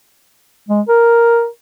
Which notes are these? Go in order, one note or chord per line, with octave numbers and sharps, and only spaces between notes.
G#3
A#4